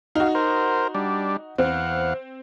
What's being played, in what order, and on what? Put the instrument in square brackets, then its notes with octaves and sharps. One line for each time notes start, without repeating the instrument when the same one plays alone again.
[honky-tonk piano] D#4 F#4 [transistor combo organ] F5
[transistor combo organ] A#4 C5
G3 D4
[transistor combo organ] E2 F5 F#5 [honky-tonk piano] C4